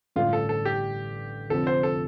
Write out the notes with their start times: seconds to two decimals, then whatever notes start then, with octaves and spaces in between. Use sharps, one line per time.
0.16 A1 G2 D3 A3 D4 F4
0.33 A4
0.49 A4
0.65 G4
1.50 F1 F2 D3 A4
1.67 C5
1.83 A4